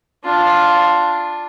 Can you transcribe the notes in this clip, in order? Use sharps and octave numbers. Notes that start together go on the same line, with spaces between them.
D4 F4